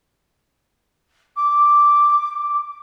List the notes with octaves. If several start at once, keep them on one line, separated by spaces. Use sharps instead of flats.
D6